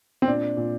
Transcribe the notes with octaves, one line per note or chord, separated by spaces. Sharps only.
C4
A#2 D4
A#2